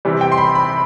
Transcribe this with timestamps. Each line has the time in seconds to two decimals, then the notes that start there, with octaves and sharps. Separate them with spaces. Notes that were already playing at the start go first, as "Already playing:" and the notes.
0.05 C3 E3 G3
0.21 G5
0.32 C6
0.38 B5
0.55 B5